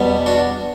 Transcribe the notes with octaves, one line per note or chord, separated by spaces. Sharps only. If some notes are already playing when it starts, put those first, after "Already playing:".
Already playing: E2 B2 G3 B3
D4 F#4